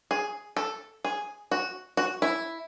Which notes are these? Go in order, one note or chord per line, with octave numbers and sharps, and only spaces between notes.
G#4
A4
G#4
F#4
F#4
E4